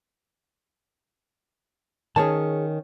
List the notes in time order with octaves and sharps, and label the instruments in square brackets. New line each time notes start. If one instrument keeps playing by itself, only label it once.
[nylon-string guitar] D#3 C#4 [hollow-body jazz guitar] G#4 C#5 A5